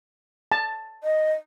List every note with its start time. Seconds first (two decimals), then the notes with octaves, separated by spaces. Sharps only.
0.52 A5
1.04 D#5